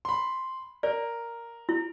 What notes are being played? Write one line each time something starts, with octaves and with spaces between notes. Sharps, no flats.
B5 C6
A#4 D5
E4